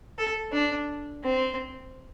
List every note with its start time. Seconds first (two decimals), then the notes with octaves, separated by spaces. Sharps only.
0.18 A4
0.53 D4
1.24 C4